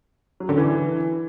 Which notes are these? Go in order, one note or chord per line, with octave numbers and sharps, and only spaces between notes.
F#3
D3
E3